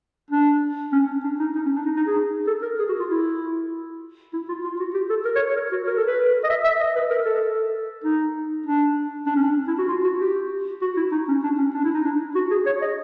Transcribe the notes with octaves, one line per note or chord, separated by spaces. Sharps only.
D4
C#4
D4
D#4
D#4
C#4
D4
D#4
D#4
G#4
A4
A#4
G#4
F#4
F4
E4
E4
F4
F4
F#4
G4
A4
A#4
C#5
C#5
A#4
F#4
A#4
A4
B4
D#5
E5
E5
D#5
B4
A#4
A4
D#4
D4
D4
C#4
D4
E4
F#4
F4
F#4
G4
F#4
E4
D#4
C#4
D4
C#4
D4
E4
D#4
D4
F#4
G#4
C#5
D#5